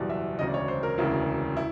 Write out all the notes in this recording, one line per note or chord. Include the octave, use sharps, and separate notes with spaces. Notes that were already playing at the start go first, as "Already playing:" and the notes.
Already playing: F#1 E2 B2 G3 D5
E5
E1 D2 C#3 D#5
D5
C#5
C5
A#4
E1 D2 C#3 E3
E4